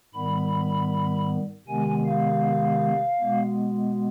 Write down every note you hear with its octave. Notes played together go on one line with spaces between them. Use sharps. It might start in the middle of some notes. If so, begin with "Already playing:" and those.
G#2 D#3 G3 B3 B5
C3 D#3 G#3 B3 G#5
F5
B2 G#3 B3